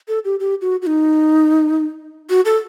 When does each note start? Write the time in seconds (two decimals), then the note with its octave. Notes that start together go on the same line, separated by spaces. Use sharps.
0.08 A4
0.25 G4
0.40 G4
0.61 F#4
0.82 F#4
0.87 D#4
2.30 F#4
2.45 A4